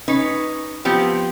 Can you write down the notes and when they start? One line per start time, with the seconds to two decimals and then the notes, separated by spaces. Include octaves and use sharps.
0.08 C#4 D#4 B4
0.85 F3 B3 C4 G4